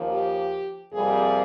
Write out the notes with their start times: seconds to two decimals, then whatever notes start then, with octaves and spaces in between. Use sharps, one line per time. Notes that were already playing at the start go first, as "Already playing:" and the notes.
Already playing: D#2 C#3 F3 A#3
0.11 G4
0.92 F2 C3 G3 A#3 G#4